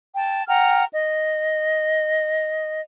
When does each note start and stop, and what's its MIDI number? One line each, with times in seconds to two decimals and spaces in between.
0.15 0.42 79
0.15 0.42 81
0.47 0.84 78
0.47 0.84 79
0.47 0.84 82
0.47 0.84 89
0.91 2.80 75